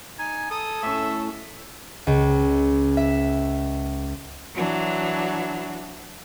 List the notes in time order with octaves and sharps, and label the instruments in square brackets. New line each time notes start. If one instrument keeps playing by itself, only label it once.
[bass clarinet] D#4 [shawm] G#5
[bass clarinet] A4 [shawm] D#6
[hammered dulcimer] A2 C#4 [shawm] E5
[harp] C#2
E5
[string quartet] E3 F#3 D4